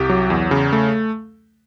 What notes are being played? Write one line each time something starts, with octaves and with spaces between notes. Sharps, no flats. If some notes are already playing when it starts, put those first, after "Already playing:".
Already playing: C2 C3 G4
F#3
E2
C#3
A3